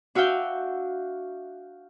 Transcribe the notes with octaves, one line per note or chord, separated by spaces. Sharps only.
D4 F#4 E5 F5 G5